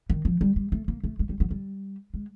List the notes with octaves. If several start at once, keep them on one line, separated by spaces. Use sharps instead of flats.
D#3
F3
G3
G3
A3
A#3
A3
G#3
G3
F#3
G3
G#3